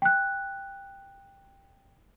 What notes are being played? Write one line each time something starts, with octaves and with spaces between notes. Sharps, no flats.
G5 F#6